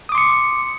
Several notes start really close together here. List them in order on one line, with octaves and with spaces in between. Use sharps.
D#6 D6 C6 C#7